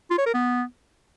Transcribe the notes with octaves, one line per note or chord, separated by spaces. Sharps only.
F4
C#5
A#4
B3